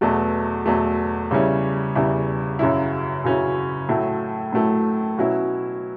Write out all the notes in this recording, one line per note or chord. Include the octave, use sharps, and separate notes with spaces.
E2 B2 F#3 A3
E2 B2 F#3 A3
E2 C#3 G3 C#4 E4
E2 C#3 G3 C#4 E4
F#2 C#3 F#3 C#4 E4
F#2 C#3 F#3 C#4 E4
A2 F#3 A3 E4
A2 F#3 A3 E4
B2 F#3 C#4 E4